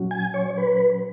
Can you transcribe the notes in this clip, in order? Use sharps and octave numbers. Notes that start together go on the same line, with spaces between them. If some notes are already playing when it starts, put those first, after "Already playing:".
Already playing: A#2 F#3 C#4 F#4
G#5
C#5
B4